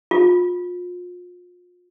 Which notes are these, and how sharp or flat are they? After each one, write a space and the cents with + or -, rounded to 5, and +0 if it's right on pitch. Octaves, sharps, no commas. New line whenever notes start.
F4 +35